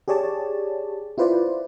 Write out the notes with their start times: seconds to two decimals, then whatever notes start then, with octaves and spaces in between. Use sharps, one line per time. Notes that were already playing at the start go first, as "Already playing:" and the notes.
0.08 G4 G#4 C#5 D5 A5
1.18 E4 F4 B4 C5 D5